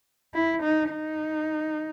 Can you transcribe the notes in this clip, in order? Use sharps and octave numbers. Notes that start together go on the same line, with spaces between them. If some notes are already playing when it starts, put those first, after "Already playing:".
E4
D#4
D#4